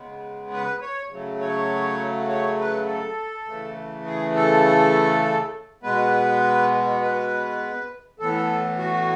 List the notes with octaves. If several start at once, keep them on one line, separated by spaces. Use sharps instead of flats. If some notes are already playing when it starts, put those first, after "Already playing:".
Already playing: C#3 G#3 B3
B4
C#5
C#3 F#3 A3
C#5
C#5
B4
A4
C#3 E3 A3
G#4
A4
B2 G#3 B3 B4
B4
A2 E3 B3 A4
F#4